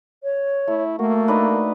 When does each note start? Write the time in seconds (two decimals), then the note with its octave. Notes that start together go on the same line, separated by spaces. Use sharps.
0.23 C#5
0.68 A3 E4
0.99 A3 A#3 F#4
1.28 D4 D#4 B4